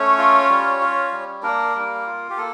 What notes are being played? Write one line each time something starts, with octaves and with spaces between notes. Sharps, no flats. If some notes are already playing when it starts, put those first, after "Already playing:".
Already playing: A3 C#4 C#5
F4
G3
F4
G3
A#3 D4 A#4
G3
F4
G4
A#3 A4